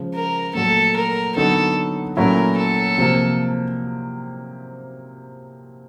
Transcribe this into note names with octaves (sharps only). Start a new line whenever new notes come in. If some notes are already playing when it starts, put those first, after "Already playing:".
Already playing: C#3 F3 G#3
A#4
A#2 F#3 A3 A4
A#4
D3 F#3 B3 D#4 F#4 A4
A#2 F#3 A3 C#4 E4 A#4
A4
C3 F3 A#3